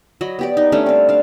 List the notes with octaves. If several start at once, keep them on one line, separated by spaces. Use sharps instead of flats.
F#3 D#5 B5
B3 G4 D5
D#4
G3 A3 C#4 D4
C4 F5
D4 F5